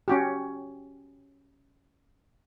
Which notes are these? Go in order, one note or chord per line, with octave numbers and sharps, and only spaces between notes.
C#4 F#4 G4